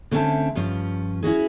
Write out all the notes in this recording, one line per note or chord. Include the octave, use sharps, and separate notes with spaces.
D3 A3 C4 C#4 E5 A5
G2 F3 C#4 F4
C#4 E4 F#4 G#4